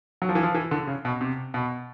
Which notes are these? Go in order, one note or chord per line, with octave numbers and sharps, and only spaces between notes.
F#3
F3
E3
F3
E3
D3
C#3
B2
C3
B2